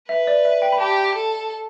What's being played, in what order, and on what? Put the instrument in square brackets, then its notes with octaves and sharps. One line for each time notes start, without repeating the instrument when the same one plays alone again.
[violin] B4 [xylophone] E5
[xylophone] D5
E5
G5
B5
[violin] G4 [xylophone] A5
[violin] A4